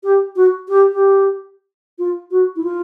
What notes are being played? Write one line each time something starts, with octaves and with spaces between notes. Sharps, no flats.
G4
F#4
G4
G4
F4
F#4
E4
F4